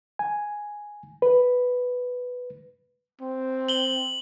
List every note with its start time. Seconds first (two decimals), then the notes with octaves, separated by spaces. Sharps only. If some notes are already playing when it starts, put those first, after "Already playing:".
0.19 G#5
1.22 B4
3.21 C4
3.68 F#7 G7